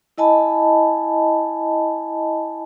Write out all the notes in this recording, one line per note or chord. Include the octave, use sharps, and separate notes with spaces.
E4 D#5 G#5 A5 B5